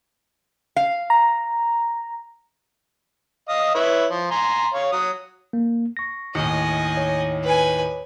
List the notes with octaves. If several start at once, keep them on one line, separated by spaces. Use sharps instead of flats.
F5
A#5
D#5 F5 D#6
E4 B4 C#5
F3
G#5 A#5 C6
C#5 F5
F#3 D#6
A#3
C#6 A#6
D#2 A2 D#5 G#5
C#5
B4 G#5